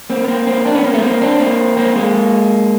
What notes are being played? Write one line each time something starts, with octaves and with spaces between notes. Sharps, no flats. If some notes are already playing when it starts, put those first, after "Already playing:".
A#3 C4
B3
A#3 C4
A#3 C4
C4 D4
B3 C#4
A#3 C4
A3 B3
A#3 C4
C4 D4
A#3 C4
A#3 C4
G#3 A#3